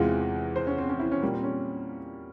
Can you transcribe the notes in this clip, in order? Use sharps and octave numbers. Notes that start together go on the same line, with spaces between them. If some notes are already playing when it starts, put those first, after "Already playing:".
Already playing: E2 C3 E3 G#3 F4
C5
C#4
C4
C#4
E4
C#4
A#2 G3 A#3
C4
C#4